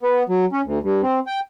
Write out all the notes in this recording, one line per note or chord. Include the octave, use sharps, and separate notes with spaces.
B3
F#3
C#4
D2
G2
C4
G5